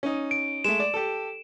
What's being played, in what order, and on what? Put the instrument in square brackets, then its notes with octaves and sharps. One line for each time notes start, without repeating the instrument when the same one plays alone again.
[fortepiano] C#4 D#4
[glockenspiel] D7
[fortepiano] G#3 A3 [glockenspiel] E7
[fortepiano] D5
G4 A4